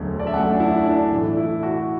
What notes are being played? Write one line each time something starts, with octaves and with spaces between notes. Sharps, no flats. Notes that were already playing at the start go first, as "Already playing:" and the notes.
Already playing: E1 D2 D3 F#3
D5
E5
F#2 F#3 A3 F#5
D4
E4
D4
B1 A2 E3
E4
F#4